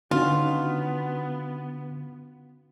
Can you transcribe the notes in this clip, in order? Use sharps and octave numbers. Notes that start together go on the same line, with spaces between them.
D3 B3 C#4 D#4 F4 F#4